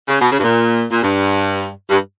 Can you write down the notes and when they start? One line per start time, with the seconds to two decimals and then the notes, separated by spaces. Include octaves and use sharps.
0.08 C#3
0.19 B2
0.31 C#3
0.39 G2
0.43 A#2
0.91 A#2
1.02 G2
1.89 G2